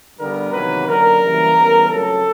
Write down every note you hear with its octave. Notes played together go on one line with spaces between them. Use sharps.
G2 D3 G3 B3 A#4
E2 C3 D#3 F#3 A#3 B4
F#2 D3 F#3 A#3 A#4
F#2 C#3 E3 G3 A#3
C#3 E3 G3 B3
F2 C#3 F#3 A3 A4